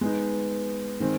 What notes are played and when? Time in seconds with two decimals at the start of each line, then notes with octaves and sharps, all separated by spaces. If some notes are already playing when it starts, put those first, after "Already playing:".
0.01 G#3 B3 D#4
1.00 D#3 G#3 C4